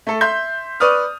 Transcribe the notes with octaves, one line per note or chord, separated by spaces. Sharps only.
A3 A4
E5 C6 G6
B4 D5 C#6 D#6 F6